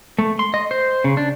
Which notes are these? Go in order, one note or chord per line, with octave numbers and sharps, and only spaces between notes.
A3
C6
D#5
C5
C#3
D4